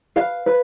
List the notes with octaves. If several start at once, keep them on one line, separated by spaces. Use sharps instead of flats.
B4 F5
B4